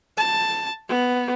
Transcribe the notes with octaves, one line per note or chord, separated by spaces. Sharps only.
A5
B3